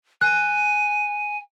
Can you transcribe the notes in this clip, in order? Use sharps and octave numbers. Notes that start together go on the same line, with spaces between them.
G#5 F#6